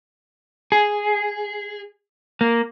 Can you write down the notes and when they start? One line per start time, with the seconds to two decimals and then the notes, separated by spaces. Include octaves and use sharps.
0.72 G#4
2.41 A#3